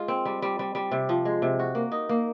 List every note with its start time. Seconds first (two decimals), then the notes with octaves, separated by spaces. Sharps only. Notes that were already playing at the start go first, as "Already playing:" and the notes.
Already playing: G#3 F4
0.08 C4
0.25 G3
0.42 G3
0.59 G3
0.75 G3
0.91 C3
1.09 F3
1.25 G#3
1.42 C3
1.59 F#4
1.75 A#3
1.92 D#4
2.09 A#3